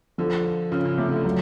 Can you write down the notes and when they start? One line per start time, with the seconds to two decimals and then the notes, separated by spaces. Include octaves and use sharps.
0.18 D3 F3
0.45 F4
0.72 C#3 F4
0.85 C#3
0.98 C3 A3
1.12 D3
1.25 F#3